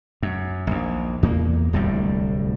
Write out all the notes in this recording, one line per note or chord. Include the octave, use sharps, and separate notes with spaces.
F#2
A#1 D#2
E2 A#3
D1 C2 A2 G3